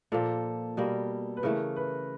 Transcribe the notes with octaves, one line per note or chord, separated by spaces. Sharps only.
A#2 F3 A#3 A4
B2 G3 A#3
B4
C#3 E3 A3 A#4
B4